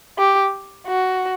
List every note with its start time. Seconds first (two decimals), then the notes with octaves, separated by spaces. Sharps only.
0.18 G4
0.87 F#4